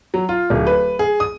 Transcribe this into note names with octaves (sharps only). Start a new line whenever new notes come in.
F#3
F4
D1
B4
G#4
D#6